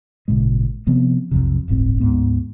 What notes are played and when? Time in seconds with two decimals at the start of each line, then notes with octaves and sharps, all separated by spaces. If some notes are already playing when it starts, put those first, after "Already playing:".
0.28 G#1 A#2 C#3 G#3
0.87 C3 F3 B3 C4
1.31 B1 F2 C3
1.68 D1 G1 A2 C4
2.00 D2 G#2 B3